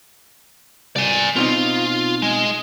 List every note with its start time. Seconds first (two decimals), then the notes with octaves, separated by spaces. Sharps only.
0.96 C2 D5 G#5
1.36 B2 C4 D#4 F4
2.22 G#3